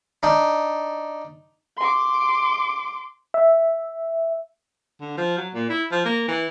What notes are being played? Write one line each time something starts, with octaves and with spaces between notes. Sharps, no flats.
D4 D#4
C6 D6
E5
D3
F3
F#3
A#2
E4
F3
A#3
E3